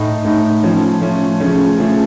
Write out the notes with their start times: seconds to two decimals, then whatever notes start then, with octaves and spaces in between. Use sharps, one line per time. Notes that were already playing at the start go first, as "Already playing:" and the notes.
Already playing: A2 A3 D#4
0.25 A2 A3 D#4
0.63 F3 A3 C#4
1.01 F3 A3 C#4
1.40 C#3 F3 A3 C#4
1.78 C#3 F3 A3 C#4